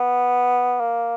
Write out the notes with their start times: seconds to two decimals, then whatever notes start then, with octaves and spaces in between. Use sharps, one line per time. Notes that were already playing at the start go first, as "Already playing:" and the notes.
Already playing: B3
0.80 A#3